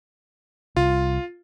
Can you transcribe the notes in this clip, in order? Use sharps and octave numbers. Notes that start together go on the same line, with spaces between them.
C2 F4